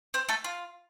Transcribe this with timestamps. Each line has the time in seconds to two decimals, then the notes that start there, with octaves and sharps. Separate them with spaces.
0.14 C4 C5
0.29 A3 A4
0.44 F4